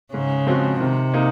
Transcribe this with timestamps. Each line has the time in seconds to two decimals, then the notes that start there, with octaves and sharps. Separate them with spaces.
0.14 G#2 C#3
0.47 F3 G#3 C4 F#4
0.80 C3 D#3
1.14 A#3 D#4